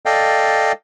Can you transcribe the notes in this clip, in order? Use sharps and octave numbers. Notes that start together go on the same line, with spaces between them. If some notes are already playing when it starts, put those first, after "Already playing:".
A4 D5 D#5 F5 G5